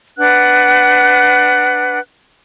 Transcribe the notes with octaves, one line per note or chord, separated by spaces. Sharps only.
D4 B4 F#5 F#6